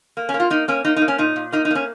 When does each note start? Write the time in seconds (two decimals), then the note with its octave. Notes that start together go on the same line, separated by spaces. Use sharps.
0.17 A#3
0.29 C#4
0.34 A#3
0.40 F4
0.50 A#3 D#4
0.68 A#3 C#4
0.84 A#3 D#4
0.96 D#4
1.02 A#3
1.08 C#4
1.18 A#2 D#4
1.36 A#2
1.52 A#3 D#4
1.65 D#4
1.70 A#3 C#4